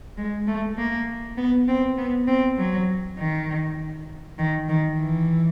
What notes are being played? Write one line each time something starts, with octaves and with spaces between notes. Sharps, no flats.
G#3
A3
A#3
B3
C4
B3
C4
F#3
D#3
D#3
D#3
E3